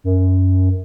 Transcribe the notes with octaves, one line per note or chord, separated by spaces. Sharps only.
F#2